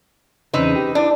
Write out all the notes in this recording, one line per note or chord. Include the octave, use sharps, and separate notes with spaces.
E2 A#2 C#3 C4 D#4 B4
G4
D4 E4 D5